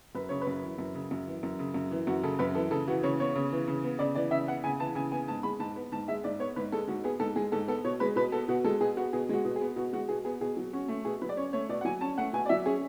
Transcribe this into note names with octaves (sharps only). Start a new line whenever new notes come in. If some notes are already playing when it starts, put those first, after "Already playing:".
F#2 B4
C#3 C#5
B4
F#2
E3
F#2
C#3
F#2
E3
F#2
C#3
F#2
E3
F#2 F#4
C#3 A4
F#2 B4
E3 A4
C#3 A4
E3 F#4
C#3 C#5
B3 C#5
C#3
E3
C#3
B3
C#3 D5
E3 D5
C#3 E5
B3 F#5
C#3 G#5
E3 A5
C#3 G#5
B3 G#5
G#2 A5
G#3 B5
G#2 A5
B3
G#2 A5
G#3 E5
G#2 D5
B3 C#5
G#2 B4
G#3 A4
G#2 F#4
B3 G#4
G#2 A4
G#3 G#4
G#2 A4
B3 A4
B2 C#5
G#3 B4
B2 B4
B3 A4
B2 F#4
G#3 A4
B2 G#4
B3 F#4
B2 G#4
G#3 F#4
B2
G#4
B3
B2 F#4
G#3 F#4
B2 G#4
B3 G#4
B2 G#4
F#3
C#4 F#4
A3
B2 G#4
F#3 B4
D5
C#4 C#5
A3 C#5
B2 D5
F#5
F#3 G#5
C#4 A5
A3 F#5
B2 G#5
D5
F#3 E5
C#4 G#4